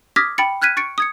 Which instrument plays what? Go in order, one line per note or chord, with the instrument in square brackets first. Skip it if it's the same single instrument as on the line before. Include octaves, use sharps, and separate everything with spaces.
[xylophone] D6 D#6 F6 G#6 A#6 B6
G5 B5 A6 C#7
F6 F#6 G#6 B6 D#7
C#6 A6 C#7 D7
D#6 G#6 C#7